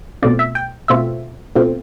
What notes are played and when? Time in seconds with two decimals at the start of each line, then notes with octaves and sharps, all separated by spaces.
0.23 B2 A3 C4 F4 D5
0.39 E5
0.55 G5
0.88 B2 A3 C4 F4 E5
1.55 B2 A3 C4 F4